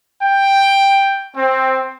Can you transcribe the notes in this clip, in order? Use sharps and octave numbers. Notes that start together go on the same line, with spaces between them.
G5
C4